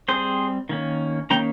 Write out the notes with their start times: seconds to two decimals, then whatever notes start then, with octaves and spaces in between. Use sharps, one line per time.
0.08 G3 C4 G#4 C5
0.69 D#3 A#3 C#4
1.30 D#3 A#3 C#4 G5 A#5